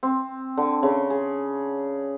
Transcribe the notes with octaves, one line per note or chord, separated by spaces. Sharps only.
C4
D3
C#3
G#4